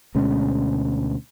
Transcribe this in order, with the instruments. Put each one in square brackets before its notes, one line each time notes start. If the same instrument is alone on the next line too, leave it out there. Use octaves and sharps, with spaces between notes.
[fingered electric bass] D2 B2 G#3 C#4